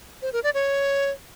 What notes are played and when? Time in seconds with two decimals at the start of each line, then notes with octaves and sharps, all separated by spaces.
0.22 C5
0.33 A#4
0.44 D5
0.54 C#5